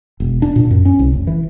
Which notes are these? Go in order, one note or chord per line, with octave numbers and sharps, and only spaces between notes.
E1
D4
A#2
F#2
C#4
C2
F1
E3